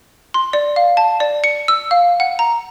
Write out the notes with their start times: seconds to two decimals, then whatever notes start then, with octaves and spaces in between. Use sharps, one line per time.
0.34 C6
0.53 D5
0.76 F5
0.97 A5
1.20 D5
1.44 C#7
1.68 E6
1.91 F5
2.20 F#5
2.39 A#5